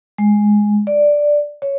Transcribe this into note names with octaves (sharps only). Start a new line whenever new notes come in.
G#3
D5
C#5